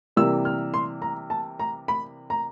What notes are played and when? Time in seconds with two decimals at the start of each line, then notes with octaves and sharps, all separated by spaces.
0.16 C3 E3 G3 A#3 E6
0.45 F6
0.74 C6
1.02 A#5
1.30 A5
1.60 A#5
1.88 B5
2.30 A#5